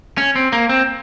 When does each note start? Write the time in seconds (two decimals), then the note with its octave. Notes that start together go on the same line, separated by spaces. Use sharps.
0.18 C#4
0.36 C4
0.53 A#3
0.69 C4